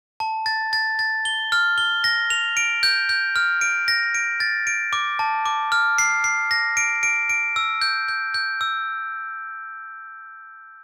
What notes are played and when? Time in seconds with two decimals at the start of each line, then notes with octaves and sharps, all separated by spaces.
0.20 A5
0.46 A6
0.73 A6
0.99 A6
1.25 G7
1.52 F6
1.78 G7
2.04 A#6
2.30 F7
2.57 D7
2.83 G6
3.09 G6
3.36 F6
3.61 D7
3.88 A#6
4.15 D7
4.40 A6
4.67 D7
4.93 D6
5.19 A5
5.46 D6
5.72 F6
5.98 C7
6.24 C7
6.51 A#6
6.77 D7
7.03 D7
7.29 D7
7.56 E6
7.81 G6
8.08 G6
8.34 G6
8.61 E6